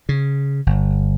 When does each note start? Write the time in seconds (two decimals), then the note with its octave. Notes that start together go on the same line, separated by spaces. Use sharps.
0.09 C#3
0.66 G1